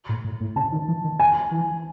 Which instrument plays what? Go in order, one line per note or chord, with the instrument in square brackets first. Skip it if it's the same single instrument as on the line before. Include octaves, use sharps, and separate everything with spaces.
[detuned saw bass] A2
A2
A2
[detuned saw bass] C#3 [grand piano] A5
[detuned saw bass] D#3
E3
D#3
[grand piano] G#5
[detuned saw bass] E3